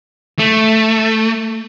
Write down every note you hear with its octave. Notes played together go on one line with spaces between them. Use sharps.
A3